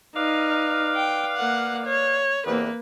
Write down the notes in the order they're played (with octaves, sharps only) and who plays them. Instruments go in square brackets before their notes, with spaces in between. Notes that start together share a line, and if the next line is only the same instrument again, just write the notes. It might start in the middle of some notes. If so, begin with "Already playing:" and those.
[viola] D#4 [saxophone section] B4 D5 F5
[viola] G5
A#3 F#5
C#5
[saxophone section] E2 C3 [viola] A#3 B4